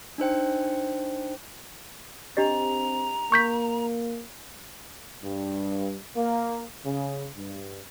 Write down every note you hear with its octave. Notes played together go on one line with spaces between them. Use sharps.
D4 D#4 C5 G5
C4 D4 G4 D#5 A#5
A#3 C#6 G6 B6
G2
A#3
C#3
G2